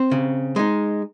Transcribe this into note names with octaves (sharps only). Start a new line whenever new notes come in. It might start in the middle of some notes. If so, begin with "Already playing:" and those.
Already playing: C4 C5
C#3
G#3 D#4